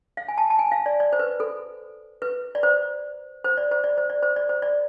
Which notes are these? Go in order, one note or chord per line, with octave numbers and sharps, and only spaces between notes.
F5
G#5
A5
A5
G#5
F5
D5
D5
C5
B4
A4
B4
D5
C5
C5
D5
C5
D5
C5
D5
C5
D5
C5
D5